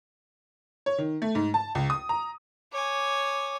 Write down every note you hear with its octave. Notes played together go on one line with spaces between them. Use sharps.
C#5
D#3
A3
G#2
A5
C#2
D#6
A#5
C#5 G#5 D6